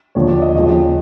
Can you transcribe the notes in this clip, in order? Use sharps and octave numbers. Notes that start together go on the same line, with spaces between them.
D#2 D3 F3 C#5
D5
D#5
D#2 C#3 F3 D#5